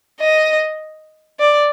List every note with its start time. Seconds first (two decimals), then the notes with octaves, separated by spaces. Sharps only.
0.20 D#5
1.40 D5